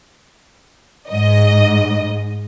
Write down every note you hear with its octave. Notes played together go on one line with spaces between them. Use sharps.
G#2 D#5